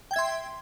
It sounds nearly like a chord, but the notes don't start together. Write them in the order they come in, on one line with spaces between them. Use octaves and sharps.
G5 G#6 E5 C6